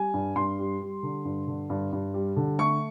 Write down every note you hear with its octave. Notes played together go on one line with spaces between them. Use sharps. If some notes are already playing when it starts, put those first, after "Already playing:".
Already playing: G3 G#5
G2
G2 C6
G3
G3
D3
G2
D3
G2
G2
G3
D3
A3 C#6